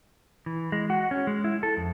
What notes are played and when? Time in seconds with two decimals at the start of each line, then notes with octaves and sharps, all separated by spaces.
0.46 E3
0.72 G#3
0.90 F#4
1.11 C#4
1.27 G#3
1.44 E4
1.63 A4
1.77 F2